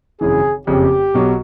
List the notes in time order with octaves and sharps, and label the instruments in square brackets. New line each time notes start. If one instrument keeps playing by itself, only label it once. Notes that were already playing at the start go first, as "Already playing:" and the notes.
[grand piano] G#1 F#2 C#3 E3 [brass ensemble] G#4
[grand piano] F#1 F2 C#3 [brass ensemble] G4
[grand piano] B1 B2 F#3